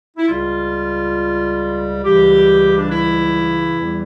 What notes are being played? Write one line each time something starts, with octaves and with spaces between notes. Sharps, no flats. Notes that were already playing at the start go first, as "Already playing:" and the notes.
E4
C#2 C#3 G3 F4
C#2 C#3 E3 G3 G4
D4
E4
E2 E3 G3